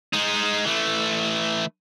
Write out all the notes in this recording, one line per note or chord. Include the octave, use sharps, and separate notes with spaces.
G#3 D#4
E3 A3